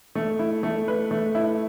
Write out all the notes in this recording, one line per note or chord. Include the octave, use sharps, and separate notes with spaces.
A3
E4
A3
B4
A3
E4